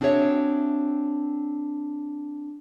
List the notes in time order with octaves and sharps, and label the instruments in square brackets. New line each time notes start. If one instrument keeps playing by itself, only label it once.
[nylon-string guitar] C4 D4 F#4 G#4 C#5 E5